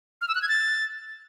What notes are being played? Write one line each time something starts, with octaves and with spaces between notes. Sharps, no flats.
F6
E6
F#6
G#6
A6